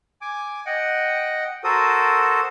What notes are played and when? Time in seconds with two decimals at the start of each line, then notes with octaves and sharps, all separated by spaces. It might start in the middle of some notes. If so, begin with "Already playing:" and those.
0.21 G#5 D6
0.66 D#5 F#5 G5
1.64 F#4 A4 A#4 C5 D#6